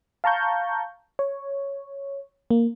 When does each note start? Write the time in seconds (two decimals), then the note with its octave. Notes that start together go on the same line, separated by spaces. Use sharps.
0.24 F5 A5 A#5 C#6 G6
1.19 C#5
2.51 A#3